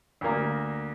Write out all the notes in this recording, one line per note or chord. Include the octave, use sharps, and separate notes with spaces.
D2 A#3